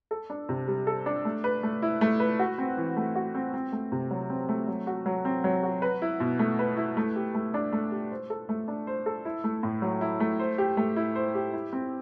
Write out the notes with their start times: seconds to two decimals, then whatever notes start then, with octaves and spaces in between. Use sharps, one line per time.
0.11 A4
0.30 D4
0.49 C3
0.67 G3
0.87 A4
1.06 D4
1.25 A3
1.44 B4
1.63 A3
1.82 E4
2.01 A3
2.20 B4
2.39 F#4
2.58 C4
2.77 E3
2.97 A3
3.15 F#4
3.35 C4
3.53 C4
3.72 A3
3.92 C3
4.11 F#3
4.30 C4
4.49 A3
4.68 F#3
4.87 F#4
5.06 F#3
5.25 C4
5.44 F#3
5.63 F#4
5.82 B4
6.02 E4
6.20 B2
6.39 A3
6.59 B4
6.77 E4
6.97 A3
7.16 G4
7.34 A3
7.54 D4
7.73 A3
7.91 G4
8.11 C5
8.30 A4
8.49 A3
8.68 D4
8.87 C5
9.06 A4
9.25 E4
9.44 A3
9.63 A2
9.82 F#3
10.01 E4
10.20 A3
10.39 C5
10.58 G4
10.77 A3
10.96 E4
11.15 C5
11.35 G4
11.53 E4
11.73 C4